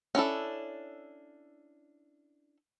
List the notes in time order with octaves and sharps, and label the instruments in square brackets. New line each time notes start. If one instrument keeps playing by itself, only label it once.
[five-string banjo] C#4 D4 E4 A4